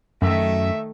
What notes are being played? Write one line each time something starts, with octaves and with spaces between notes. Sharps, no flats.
F#2 D#3 A3 E5